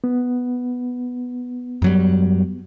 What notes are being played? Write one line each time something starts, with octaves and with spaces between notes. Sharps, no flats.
B3
F#2 F#3 G3